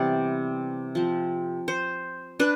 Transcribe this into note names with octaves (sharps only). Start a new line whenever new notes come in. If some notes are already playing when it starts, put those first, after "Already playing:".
Already playing: C3 E3 G3 B3 C5 D5
F3 C4
C5
D4 B4